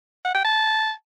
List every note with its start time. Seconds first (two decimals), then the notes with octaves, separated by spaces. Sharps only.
0.25 F#5
0.34 G5
0.44 A5